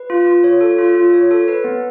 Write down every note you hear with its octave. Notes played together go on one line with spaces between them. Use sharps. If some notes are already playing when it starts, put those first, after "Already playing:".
Already playing: B4
F4
F4
C#5
A4
F4
F4
C#5
A4
B4
B3